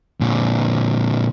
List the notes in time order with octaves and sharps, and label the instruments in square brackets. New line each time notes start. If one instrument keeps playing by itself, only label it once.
[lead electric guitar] A#2 D3